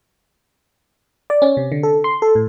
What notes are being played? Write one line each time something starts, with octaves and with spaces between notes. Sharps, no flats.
D5
C#4
C3
D3
A4
C6
A4
A2